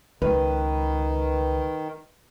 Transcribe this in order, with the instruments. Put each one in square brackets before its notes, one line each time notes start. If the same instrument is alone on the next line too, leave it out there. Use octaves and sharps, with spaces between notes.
[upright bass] C#2 [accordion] D#3 [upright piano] B4